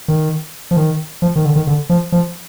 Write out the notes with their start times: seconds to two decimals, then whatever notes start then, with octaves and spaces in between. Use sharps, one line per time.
0.08 D#3
0.71 F3
0.77 D#3
1.22 F3
1.36 D#3
1.45 D3
1.56 D#3
1.67 D3
1.89 F3
2.12 F3